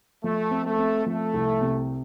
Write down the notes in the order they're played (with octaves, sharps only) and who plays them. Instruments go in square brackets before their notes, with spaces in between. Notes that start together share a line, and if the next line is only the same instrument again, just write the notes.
[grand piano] F3 [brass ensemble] A3
[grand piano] C4
[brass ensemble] A3
[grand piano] C4
[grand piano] F3 [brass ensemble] A3
[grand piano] C2
C3